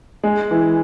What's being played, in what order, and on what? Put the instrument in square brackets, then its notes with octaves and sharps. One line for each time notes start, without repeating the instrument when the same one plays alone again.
[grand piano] G#3
E3